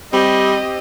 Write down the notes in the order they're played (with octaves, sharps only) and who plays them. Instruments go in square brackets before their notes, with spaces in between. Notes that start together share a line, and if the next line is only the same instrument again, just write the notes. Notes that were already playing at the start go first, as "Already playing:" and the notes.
[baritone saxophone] G3 [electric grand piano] C4 G4 [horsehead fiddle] D#5